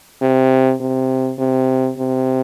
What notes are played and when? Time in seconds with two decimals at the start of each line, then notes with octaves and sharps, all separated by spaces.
0.22 C3
0.81 C3
1.38 C3
1.98 C3